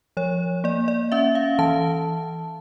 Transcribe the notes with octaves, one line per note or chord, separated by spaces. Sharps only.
F3 C#5
A#3 D5
D5
C#4 E5
F5
E3 A5